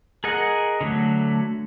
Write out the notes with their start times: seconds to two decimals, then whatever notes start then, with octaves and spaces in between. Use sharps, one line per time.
0.24 G#4 A#4 D#5 F#5
0.81 D3 F#3 A3